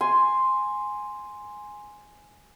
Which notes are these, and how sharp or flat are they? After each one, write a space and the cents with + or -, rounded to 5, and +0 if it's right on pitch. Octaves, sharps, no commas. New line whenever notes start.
G#5 +0 C6 +0